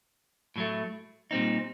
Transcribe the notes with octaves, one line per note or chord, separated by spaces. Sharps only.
A2 F#3 A3
A#2 G3 C4 D#4